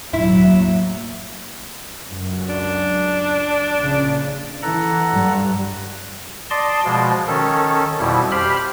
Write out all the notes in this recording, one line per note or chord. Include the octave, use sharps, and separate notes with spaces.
E1 A2 F#3 E4
A#3
C#2 F#2
D4
A#1 C#3
E3 A4 F#5 A#5
G2 G3
D5 D#5 A5 C6
B2 F3 G#3
D#3 C#4 A4
F2 B2 G3 E4
G4 C5 B5 F6